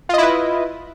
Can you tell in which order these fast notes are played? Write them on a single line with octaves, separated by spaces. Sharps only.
F4 D#5 E4 B4